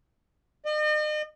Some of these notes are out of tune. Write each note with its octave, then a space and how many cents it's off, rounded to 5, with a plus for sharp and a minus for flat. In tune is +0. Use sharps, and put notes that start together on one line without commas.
D#5 -40